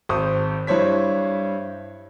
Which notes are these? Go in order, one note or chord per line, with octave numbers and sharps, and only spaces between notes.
G#1 C5 C#6 D#6
G2 E4 C5 C#5 B6